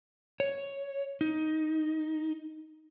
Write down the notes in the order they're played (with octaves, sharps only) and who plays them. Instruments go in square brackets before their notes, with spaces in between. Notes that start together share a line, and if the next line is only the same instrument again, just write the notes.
[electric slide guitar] C#5
D#4